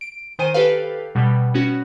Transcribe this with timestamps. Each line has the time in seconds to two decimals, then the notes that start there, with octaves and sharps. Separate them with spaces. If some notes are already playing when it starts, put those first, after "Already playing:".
0.01 D7
0.39 D#3 C5 G#5 D#7
0.54 G4 A4 B4 F5
1.15 B2 G3
1.54 B3 C#4 F#4